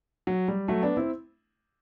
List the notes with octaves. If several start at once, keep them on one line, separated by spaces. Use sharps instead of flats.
F#3
G3
F#3 A3
B3 D4
C4 E4